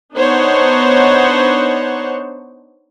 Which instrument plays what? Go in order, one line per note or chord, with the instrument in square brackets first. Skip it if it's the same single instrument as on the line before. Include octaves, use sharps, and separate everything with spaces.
[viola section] B3 D4 D#4 C5 C#5 F#5